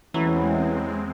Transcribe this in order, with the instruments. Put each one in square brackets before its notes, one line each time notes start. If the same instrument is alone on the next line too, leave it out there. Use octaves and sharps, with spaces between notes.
[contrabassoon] A1 [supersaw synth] E2 G#3 C4 [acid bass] E3 [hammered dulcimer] F#3